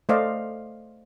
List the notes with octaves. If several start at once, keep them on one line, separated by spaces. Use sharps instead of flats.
A3 C5 D5 D#5 F5